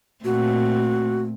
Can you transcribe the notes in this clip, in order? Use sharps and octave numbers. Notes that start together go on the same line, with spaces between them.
A#2 A3 C4 F#4